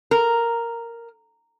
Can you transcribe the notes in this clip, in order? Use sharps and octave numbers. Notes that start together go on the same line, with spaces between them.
A#4